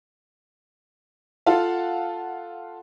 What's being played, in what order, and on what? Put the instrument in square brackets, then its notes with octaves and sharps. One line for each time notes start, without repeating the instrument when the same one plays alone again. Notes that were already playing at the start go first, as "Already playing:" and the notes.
[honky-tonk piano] F4 A4 F5 F#5